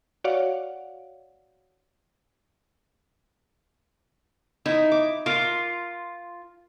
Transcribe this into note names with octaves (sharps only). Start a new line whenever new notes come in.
F#4 C#5 D5 F5 F#5
D#4 E4
D6
F4 A#4 F5 D6